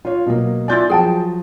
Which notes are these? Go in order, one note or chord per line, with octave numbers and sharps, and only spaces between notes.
F4 C#5
B2 F#3 A#3
E4 F4 D5 G#5 G6 A6
F3 F#3 G#4 G5 A5